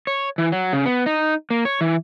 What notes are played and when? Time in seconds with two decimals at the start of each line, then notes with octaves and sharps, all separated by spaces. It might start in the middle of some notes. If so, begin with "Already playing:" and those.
0.07 C#5
0.38 E3
0.52 F#3
0.73 C#3
0.86 B3
1.06 D#4
1.50 A#3
1.65 C#5
1.81 E3